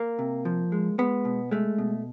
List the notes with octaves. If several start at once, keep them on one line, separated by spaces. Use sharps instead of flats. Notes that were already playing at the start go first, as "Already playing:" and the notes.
Already playing: A#3
C3
F3
G#3
G#3 B3
B2
G#3 A3
B2